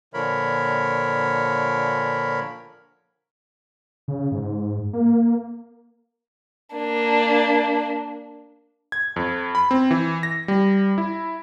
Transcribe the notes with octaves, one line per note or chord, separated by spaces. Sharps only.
A#2 D3 F3 A#4 C#5 B5
C#3
G#2
A#3
A#3 D4
G#6
F2
B5
C4
E3
A#6
G3
E4